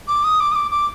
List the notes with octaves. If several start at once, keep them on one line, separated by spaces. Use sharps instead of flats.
D6
D#6
D6
D#6
D6
D6